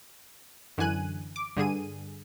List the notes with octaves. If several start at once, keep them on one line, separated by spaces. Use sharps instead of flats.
F#2 D3 E3 G#5 F#6 D#7
D6
G2 D3 G#4 D#7